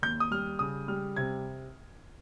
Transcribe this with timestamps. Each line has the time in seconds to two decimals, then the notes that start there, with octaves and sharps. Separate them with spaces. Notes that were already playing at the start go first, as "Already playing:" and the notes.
0.02 D#2 G6
0.20 D#6
0.31 G3 F6
0.59 C#3 D#6
0.88 G3 F6
1.16 C3 G#6